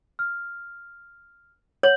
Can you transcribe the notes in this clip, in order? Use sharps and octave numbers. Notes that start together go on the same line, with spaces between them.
F6
C#5 F#5 G6 F#7